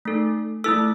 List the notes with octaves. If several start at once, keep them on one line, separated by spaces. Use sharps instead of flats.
A3 D#4 A4
A3 E4 A4 E6